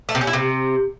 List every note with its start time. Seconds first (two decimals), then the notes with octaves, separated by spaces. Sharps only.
0.09 A3
0.15 C3
0.21 C#4
0.27 E4
0.33 C3